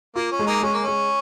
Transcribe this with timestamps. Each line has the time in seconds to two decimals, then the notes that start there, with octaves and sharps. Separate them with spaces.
0.15 A#3 F4
0.32 C#4
0.39 G#3
0.47 A#3 D#4
0.62 G#3 C#4
0.73 A#3
0.84 G#3 C#4